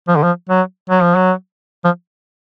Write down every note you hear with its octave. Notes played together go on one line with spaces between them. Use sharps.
F3
D3
F3
F#3
F#3
F3
F#3
F3